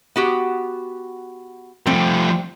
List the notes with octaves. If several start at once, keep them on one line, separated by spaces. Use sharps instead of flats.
B3 F#4 G4
F3 G3 A3 C4